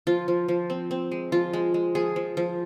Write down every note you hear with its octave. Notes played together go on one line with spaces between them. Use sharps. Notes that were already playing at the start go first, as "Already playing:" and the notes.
F3 F4
F3
F3
C4
C4
G#3
F3 F4
G#3
G#3
F3 G#4
F3
F3